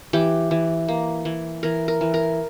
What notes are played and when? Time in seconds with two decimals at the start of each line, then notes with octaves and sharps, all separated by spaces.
0.13 E3 G4
0.51 E3
0.88 A#3
1.25 E3
1.63 E3 A#4
1.88 A#4
2.01 E3
2.14 A#4